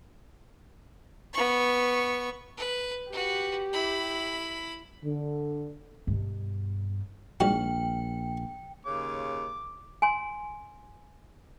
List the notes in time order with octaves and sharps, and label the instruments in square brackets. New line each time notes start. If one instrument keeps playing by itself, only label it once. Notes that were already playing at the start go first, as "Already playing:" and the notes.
[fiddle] B3 C#6
B4
[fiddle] F#4 B4 [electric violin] G4
[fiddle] E4 B5
[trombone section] D3
[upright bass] G2 B2
[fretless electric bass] A#1 [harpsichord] G#2 G3 F#4 [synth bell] G5
[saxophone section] D#2 C#3 [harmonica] D6
[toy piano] G#5 C6